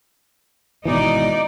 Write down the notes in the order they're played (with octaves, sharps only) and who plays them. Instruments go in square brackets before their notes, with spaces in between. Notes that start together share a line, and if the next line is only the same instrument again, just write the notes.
[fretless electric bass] G#1 B2 E3 [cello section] D#4 D5